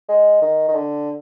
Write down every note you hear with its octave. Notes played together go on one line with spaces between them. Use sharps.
G#3
D#3
D#3
D3